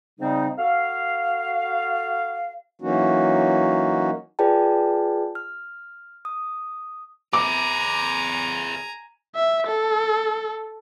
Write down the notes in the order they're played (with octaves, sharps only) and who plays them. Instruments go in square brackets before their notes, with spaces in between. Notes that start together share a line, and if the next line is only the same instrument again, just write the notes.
[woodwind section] G#2 C#3 G3 C4 D#4
F#4 A4 F5
[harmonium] E3 F#3 A#3 C#4 D#4 F#4
[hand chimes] F4 G#4 B4 D5 G5 A5
F6
D#6
[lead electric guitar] G#4 B4 [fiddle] G#5 A#5 [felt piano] D6
[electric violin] E5
A4